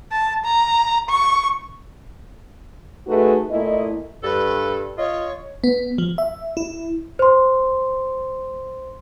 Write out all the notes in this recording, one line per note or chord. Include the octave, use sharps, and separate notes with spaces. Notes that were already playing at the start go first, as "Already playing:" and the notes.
A5
A#5
C#6
A3 D#4 F#4 G#4 B4
A#2 A3 E4 D#5
G2 A4 B4
F4 C#5 D#5
B3
F3
E5
E4
C5 C6